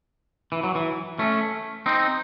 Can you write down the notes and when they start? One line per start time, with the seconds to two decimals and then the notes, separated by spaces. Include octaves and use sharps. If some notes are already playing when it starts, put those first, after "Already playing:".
0.52 E3
0.63 F#3
0.75 E3
1.19 A3 C#4
1.86 C4 D#4